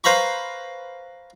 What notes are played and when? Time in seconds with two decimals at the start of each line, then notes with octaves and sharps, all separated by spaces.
0.04 B4 C5 F5 A#5 B5 C#6